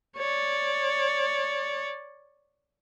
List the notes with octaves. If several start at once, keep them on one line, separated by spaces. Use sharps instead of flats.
C#5 D5